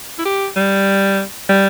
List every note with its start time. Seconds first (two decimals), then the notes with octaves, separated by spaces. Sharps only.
0.19 E4
0.26 G4
0.57 G3
1.49 G3